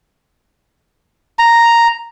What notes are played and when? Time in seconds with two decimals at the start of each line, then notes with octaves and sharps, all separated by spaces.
1.39 A#5